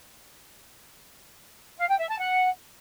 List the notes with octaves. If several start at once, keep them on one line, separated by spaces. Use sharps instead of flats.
F5
G5
E5
A5
F#5